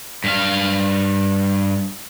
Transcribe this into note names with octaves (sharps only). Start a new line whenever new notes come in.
G2 F5